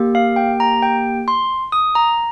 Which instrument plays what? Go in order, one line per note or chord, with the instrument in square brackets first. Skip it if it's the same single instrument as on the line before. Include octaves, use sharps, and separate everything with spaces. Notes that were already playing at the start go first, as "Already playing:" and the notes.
Already playing: [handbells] A#3 G4
F5
G5
A#5
G5
C6
D#6
A#5